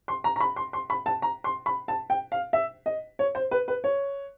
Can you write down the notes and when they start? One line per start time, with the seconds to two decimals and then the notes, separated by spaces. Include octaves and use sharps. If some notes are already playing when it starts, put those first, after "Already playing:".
0.08 C6
0.24 A#5
0.36 A#5
0.40 B5
0.56 C6
0.73 C6
0.90 B5
1.06 A5
1.22 A#5
1.44 C6
1.66 B5
1.88 A5
2.10 G5
2.32 F5
2.53 E5
2.86 D#5
3.19 C#5
3.35 C5
3.51 B4
3.68 B4
3.84 C#5